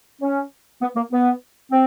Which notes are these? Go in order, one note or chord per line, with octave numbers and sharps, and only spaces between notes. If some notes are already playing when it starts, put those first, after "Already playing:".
C#4
B3
A#3
B3
C4